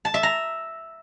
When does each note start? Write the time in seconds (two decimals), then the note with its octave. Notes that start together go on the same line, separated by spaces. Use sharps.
0.05 A5
0.14 E5
0.23 A#5